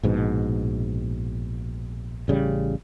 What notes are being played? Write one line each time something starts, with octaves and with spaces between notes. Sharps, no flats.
A#1 G#2 B2
A1 C#3 G3